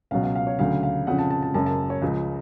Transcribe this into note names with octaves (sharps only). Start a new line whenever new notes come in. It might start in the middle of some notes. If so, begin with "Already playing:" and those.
C#2 B2 F#3 F5
F5
F5
C#5
D2 C#3 F#3 F5
F5
F2 C#3 F3 F#5
A5
A5
A5
F#1 F#2 C#3 A5
A5
C#5
C#2 C#3 F3